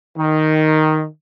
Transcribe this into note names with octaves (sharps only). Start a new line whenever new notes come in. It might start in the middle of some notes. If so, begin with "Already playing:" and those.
D#3